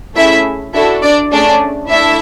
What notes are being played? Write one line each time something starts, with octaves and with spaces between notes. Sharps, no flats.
A3 C#4 E4 G#4 E5
D4 E4 F#4 A4 E5
D4 D5
A3 C#4 D4 G#4 D5
A3 D4 E4 A4 E5